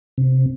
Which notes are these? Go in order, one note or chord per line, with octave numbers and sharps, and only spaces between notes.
C3